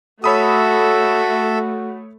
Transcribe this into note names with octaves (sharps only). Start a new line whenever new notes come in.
A3 F#4 A4 C#5 E5 B5 D#6